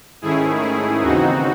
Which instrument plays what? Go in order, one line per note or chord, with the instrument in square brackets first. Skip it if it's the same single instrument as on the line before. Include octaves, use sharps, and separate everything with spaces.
[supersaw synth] G#2 D#3 A3 C#4 E4 G#4
E4 G#4
D#2 C#3 E3 C4 D#4 F#4